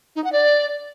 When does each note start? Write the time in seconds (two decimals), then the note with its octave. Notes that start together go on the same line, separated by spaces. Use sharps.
0.16 D#4
0.24 F#5
0.32 D5